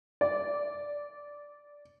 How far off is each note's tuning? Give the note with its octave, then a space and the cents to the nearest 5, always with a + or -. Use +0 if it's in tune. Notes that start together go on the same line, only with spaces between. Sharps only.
D5 -10